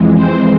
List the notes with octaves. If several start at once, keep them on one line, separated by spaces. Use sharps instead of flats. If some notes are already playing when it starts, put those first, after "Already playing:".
Already playing: F2 E3 G#3
C4 C5